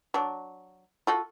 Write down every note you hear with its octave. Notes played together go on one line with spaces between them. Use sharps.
F#3 D4
F4 F#4 A4